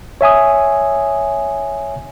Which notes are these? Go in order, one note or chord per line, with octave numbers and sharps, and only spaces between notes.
C#5 E5 G#5 D#6